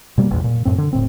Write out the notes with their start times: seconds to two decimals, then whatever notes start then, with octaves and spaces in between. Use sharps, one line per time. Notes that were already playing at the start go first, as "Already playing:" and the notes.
0.18 B2 G3 A3 A#3
0.31 A1 E2
0.44 A#2
0.65 F#2 A2 C4
0.78 D3
0.93 E1 A2 C4